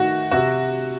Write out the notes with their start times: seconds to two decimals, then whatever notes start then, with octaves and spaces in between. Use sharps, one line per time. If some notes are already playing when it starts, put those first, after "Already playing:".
Already playing: D#3 A3 F#4
0.31 C3 F#4